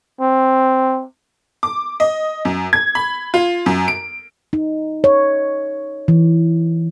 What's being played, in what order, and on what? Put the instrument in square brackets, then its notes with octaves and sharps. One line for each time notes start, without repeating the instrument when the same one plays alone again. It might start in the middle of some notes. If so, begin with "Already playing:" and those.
[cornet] C4
[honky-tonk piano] D6
D#5
F#2
G#6
B5
F4
F#2
D7
[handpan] D#4
C#5
E3